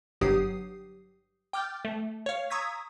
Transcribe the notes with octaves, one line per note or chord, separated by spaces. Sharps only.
G1 G2 F#3 G4 D#6 C7
G5 D6 F6 G6 A6
A3
C#5 F5
A#5 C#6 D#6 E6 G#6 B6